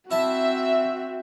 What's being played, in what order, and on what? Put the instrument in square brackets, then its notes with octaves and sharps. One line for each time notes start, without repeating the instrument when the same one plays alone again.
[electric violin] C4 F#4 [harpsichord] E4 A5 [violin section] E5